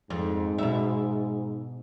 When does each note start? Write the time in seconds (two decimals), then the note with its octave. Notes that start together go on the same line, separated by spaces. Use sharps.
0.10 F2 G#2
0.58 B2 E5